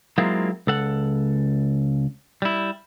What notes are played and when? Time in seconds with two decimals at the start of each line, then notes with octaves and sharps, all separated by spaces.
0.18 F#3 G#3 A#3 C4 E4 F4
0.67 C#2 A4 F#5
2.42 G3 E4